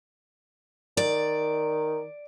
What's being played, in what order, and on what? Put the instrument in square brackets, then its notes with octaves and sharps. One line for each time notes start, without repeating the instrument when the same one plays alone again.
[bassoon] D#3 [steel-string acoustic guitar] D5